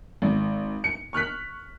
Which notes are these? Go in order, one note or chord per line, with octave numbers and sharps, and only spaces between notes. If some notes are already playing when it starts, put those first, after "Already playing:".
G#1
C#7
C#6 F6 F#6 B6